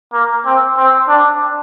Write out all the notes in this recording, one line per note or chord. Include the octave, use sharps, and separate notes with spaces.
A#3
C4
C4
D4